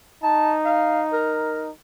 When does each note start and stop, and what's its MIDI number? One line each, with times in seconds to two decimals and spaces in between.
0.23 1.72 63
0.23 0.52 81
0.65 1.02 77
1.13 1.69 70